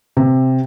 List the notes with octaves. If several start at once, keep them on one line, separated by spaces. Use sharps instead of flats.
C3